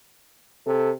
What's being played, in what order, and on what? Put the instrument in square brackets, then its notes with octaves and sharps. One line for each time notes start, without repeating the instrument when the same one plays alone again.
[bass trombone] C3 [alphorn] A4